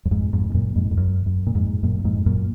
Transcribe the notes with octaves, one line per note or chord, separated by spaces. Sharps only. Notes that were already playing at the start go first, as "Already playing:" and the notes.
F#2
F2 G#2
F2 G#2
G#2
F#2 A#2
F2 G#2
F2
F#2
F#2
A#2
F2 G#2
F#2 A#2
A#2
F2 G#2
F#2 A#2